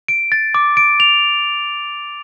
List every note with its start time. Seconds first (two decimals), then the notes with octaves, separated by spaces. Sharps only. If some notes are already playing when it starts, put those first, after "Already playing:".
0.08 D7
0.32 A6
0.55 D6
0.77 D7
1.00 F7